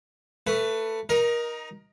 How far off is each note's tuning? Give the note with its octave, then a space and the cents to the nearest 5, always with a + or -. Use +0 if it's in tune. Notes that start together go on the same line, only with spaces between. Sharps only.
A3 +20 B4 +0
D#4 +0 A#4 +25